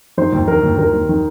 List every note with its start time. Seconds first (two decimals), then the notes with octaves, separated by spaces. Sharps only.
0.18 D#3 C5
0.33 D#2
0.48 D#3 A#4
0.63 D#2
0.78 D#2 A#4
0.93 D#2
1.09 D#3